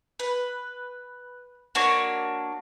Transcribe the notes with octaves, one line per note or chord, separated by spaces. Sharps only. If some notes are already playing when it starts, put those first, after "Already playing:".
B4
A#3 D4 F#4 C#5